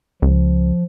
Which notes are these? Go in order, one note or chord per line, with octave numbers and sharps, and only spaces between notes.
C#2 F3